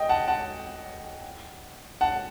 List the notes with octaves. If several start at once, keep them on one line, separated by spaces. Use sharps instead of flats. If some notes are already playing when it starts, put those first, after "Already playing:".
Already playing: D#5 G5
F#5 A5
F#5 A5
F#5 A5